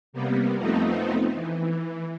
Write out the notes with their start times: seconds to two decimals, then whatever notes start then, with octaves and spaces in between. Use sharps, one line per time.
0.13 C3 G3 A#3 B3
0.56 F2 F3 A3 B3 C4 D#4
1.34 E3